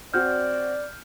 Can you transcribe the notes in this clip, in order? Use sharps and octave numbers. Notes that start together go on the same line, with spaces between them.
C4 F#4 D5 F6 G6